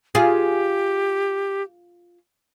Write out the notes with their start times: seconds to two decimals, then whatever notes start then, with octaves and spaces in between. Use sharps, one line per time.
0.15 F4 G4 G#4